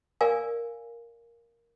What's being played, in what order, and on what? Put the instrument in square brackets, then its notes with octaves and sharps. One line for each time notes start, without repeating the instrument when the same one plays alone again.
[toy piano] A#4 D5 F5 G#5